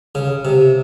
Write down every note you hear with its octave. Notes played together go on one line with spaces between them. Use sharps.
C#3
C3